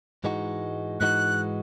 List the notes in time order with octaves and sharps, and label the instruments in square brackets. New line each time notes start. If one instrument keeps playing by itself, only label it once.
[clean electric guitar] G#2 E3 G#3 D#4 F#4
[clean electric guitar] G#2 E3 G#3 D#4 F#4 [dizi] F#6